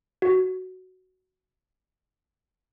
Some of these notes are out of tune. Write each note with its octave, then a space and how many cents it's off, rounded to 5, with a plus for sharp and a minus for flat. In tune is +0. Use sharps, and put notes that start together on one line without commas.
F#4 +5